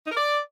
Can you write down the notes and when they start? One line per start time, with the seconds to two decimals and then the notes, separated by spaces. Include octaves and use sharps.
0.05 D#4
0.10 A#4
0.16 D5